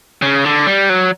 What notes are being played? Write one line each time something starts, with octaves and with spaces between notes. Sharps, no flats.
C#3
D3
G3
F#3